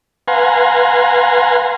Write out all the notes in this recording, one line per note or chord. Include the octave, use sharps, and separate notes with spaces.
B4 F5 F#5 G#5 A#5 C6